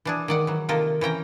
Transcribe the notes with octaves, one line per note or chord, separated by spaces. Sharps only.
E3 D4 G#4
D#3 D5 F#5
E3 F#3
C3 D#3 A#3 F4 A4 A#4
E3 C#4 G5 A#5